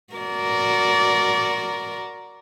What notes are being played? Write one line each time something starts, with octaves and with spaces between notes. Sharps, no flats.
F#4 A#4 D5